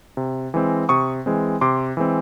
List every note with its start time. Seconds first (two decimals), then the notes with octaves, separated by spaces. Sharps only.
0.17 C3
0.54 E3 G#3 C4
0.89 C3 C#6 D#6
1.26 E3 G#3 C4
1.61 C3 C6 D6
1.97 E3 G#3 C4